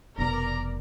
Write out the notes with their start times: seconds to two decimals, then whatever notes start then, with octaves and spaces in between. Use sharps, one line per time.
0.18 F1 B2 B3 A#4 D5 A#5